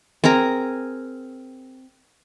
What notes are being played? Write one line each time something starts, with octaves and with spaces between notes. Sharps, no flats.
C4 G#4 A#4 A#5